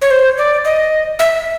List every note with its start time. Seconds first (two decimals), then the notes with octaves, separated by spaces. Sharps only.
0.02 C#5
0.11 C5
0.38 D5
0.65 D#5
1.19 E5